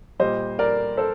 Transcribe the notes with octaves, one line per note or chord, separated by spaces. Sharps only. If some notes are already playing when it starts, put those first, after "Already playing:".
A#2 G3 C5 D#5
A#4 D5
A4 C5